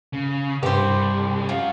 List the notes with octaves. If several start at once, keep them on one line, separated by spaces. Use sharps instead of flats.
C#3
C2 G2 G3 G4 C5
C#4 F4 F#4